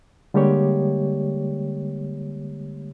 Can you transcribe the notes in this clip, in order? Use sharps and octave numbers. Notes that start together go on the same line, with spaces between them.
D3 G3 G#3 A#3 G4 C#5